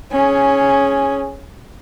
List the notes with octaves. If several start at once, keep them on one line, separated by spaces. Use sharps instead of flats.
C#4 G#4